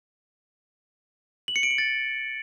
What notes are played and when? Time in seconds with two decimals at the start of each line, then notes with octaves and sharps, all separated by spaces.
1.48 F#7
1.56 C#7
1.63 D7
1.71 F#7
1.78 A6